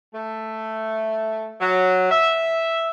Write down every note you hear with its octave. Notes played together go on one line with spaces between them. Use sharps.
A3
F#3
E5